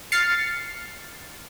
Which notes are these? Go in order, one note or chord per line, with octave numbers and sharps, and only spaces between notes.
F6 A6 C7 C#7